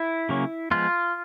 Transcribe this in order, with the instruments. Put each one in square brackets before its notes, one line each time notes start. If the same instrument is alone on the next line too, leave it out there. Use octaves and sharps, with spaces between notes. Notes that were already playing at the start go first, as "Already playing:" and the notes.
Already playing: [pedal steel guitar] E4
C#3 F#3 A#3 C#4
F3 G#3 B3 F4